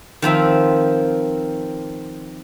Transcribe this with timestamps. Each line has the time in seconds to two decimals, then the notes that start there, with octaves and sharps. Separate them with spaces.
0.22 D#3 F3 C4 E5